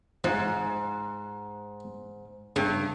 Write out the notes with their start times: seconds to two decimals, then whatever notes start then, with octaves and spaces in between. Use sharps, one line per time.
0.24 G#2 F3
2.56 G2 C#3